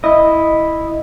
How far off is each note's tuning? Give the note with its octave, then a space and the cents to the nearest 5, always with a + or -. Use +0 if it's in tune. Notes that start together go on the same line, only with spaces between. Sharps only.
E4 -5 D#5 -5